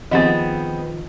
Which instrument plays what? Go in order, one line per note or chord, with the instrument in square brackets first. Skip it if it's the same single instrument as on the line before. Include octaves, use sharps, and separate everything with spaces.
[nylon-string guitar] D#3 F3 D#4 [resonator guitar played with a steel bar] B3 C4 G#4 [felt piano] D#5 A6